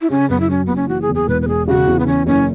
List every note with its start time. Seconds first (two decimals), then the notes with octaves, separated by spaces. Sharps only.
0.01 E4
0.10 C#3 C#4
0.29 F#2 B3
0.40 E4
0.50 F#3 C#4
0.66 F#1 B3
0.76 C#4
0.88 E3 F#4
1.02 G#4
1.09 E2
1.15 G#4
1.28 E1 B4
1.42 B4
1.47 E1 G#4
1.68 C#3 F#4
1.87 E2
1.99 B3
2.06 E3 C#4
2.26 F#1 C#4